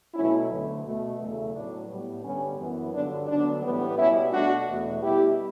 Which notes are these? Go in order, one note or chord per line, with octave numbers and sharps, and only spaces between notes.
B2 F#3 A3 C#4 E4
D2 D3 A3
B2 A3
E2 C#3 F#3 A3
A2 F#3 B3 D4
A2 G3 B3
G2 D3 G3 B3 C#4
F#2 E3 B3
G2 D3 F#3 D4
D2 D3 F#3 B3 D4
A2 E3 G3 B3
B2 G3 B3 C#4 E4
B2 A3 D4 F#4
E2 B2 A3
B2 G3 B3 E4 G4